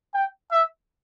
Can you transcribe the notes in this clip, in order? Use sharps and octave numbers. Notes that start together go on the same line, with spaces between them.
G5
E5